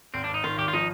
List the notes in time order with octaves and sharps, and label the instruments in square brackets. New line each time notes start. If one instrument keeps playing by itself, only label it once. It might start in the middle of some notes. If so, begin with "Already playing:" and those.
[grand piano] G#1 [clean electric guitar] C4
[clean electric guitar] D4
[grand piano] G#1 [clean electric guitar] D#4
[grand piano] D#3 [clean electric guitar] F4
[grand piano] G#1 [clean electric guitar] G4
[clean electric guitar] F4
[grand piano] F3 [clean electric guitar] D#4